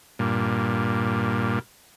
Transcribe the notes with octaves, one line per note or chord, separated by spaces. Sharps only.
G2 A#2